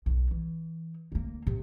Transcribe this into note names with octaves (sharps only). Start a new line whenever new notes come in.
B1
E3
D2 A#3
C3